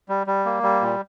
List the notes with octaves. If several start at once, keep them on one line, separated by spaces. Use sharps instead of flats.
G3
G3
A#3
G3
A#2